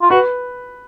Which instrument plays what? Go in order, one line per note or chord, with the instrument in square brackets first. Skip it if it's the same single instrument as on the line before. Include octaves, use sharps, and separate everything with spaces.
[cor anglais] F4
[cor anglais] F#4 [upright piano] B4